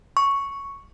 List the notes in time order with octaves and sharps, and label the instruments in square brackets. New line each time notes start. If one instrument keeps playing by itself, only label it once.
[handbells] C#6